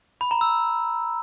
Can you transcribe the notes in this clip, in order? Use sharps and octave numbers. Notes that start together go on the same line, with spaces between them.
B5
A#5
E6